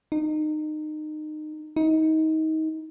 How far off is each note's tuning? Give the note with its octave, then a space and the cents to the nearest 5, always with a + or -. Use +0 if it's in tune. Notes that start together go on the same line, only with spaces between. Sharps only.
D#4 -25
D#4 +25